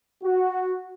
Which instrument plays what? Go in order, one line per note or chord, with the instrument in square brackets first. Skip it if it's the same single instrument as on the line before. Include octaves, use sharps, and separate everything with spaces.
[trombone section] F#4